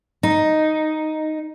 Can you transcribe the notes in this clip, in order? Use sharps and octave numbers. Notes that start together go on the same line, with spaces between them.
D#4